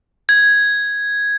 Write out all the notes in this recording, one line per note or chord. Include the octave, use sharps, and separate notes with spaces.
G#6